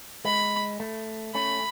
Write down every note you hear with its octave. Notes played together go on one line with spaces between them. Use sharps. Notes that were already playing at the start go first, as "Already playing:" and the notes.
G#3 B5
A3
A3 C#4 B5